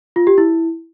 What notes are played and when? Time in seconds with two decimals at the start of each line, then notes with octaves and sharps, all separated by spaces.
0.16 F4
0.27 G4
0.38 E4